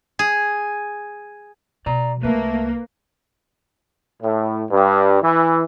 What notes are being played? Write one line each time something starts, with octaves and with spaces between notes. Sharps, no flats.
G#4
B2 D5 A#5
C2 F#3 A3 A#3 B4
A2
G2
E3